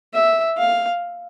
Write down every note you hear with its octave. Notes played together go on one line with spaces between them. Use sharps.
E5
F5